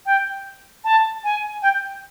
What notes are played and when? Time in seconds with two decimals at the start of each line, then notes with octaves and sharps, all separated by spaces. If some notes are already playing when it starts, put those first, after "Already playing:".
0.06 G5
0.84 A5
1.24 G#5
1.62 G5